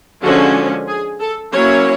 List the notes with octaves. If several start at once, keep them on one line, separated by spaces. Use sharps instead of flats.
D3 F3 G#3 C#4 F#4
G#4
A4
F#3 A#3 C#4 E4 C#5